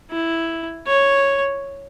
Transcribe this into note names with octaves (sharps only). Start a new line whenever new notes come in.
E4
C#5